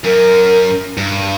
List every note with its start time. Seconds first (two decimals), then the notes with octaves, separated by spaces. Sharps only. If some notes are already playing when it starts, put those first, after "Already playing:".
0.04 F#2 A#4
0.97 G2